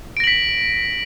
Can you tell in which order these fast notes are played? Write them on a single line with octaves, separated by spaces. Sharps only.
D7 A#6 F#7 B6